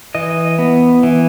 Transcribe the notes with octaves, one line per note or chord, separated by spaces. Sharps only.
E3 D#5
B3
E3